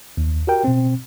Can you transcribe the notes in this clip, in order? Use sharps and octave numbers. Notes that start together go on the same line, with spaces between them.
D#2
F#4 G4 A#4 G5
B2 C4